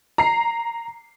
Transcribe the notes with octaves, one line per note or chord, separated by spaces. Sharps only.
A#5 C7